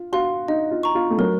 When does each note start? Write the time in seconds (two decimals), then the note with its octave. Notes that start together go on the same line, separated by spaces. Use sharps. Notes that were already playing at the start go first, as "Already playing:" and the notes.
Already playing: F4
0.13 F#4 F5 C6
0.48 D#4 D#5
0.71 F4
0.83 A#5 C#6
0.95 F4
1.10 A3
1.18 F#3 A#4